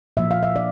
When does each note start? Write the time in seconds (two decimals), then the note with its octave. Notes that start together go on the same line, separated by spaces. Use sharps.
0.17 A#2 F3 A#3 E5
0.31 F5
0.43 E5
0.56 D5